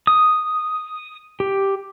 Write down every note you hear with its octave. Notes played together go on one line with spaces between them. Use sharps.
D#6
G4